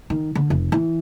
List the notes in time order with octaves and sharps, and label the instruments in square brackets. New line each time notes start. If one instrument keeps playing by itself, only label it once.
[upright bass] D#3
D3
F1
E3